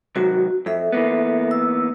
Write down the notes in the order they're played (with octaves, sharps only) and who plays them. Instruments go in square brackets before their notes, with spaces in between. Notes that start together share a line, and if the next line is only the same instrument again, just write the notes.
[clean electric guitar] C3 D#3 F#3 [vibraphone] F#4
[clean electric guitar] F2 [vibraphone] A4 E5
[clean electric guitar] E3 A#3 B3
[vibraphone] E6